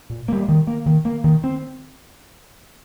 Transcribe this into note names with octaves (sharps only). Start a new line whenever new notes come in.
A#2
G3 A#3
D#3
A#3
D#3
A#3
D#3
C4